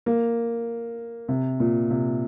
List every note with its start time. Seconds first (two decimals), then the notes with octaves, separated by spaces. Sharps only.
0.06 A#3
1.28 C3
1.60 A#2
1.90 C3